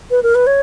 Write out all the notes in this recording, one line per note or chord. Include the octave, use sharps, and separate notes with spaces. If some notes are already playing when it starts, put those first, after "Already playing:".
B4
A#4
B4
C#5